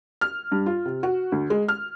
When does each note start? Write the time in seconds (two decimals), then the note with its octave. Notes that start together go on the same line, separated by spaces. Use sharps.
0.21 F6
0.52 G2
0.66 F4
0.86 C3
1.03 F#4
1.32 D2
1.50 G#3
1.68 F6